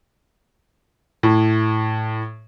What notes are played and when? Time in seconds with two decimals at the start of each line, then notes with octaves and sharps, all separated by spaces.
1.23 A2